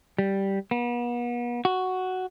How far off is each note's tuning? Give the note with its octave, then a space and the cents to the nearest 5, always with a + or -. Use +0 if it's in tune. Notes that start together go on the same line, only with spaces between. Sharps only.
G3 -5
B3 -40
F#4 +5